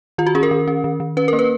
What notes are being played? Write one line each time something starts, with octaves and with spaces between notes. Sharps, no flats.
D#3 F4
F#4
C#4 G#4
A#4
D#3
C#4
D#3
D#3
C#4 B4
A#4
A#3
B4